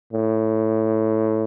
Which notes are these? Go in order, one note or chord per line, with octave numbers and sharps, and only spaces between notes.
A2